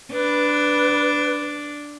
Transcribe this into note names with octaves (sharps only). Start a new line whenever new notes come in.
D4 B4